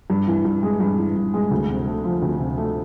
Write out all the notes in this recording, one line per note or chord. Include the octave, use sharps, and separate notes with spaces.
G2
E3
G2
G#3
G2
E3
G2
G#3
D2
C3
A3
F3
D2
C3
A3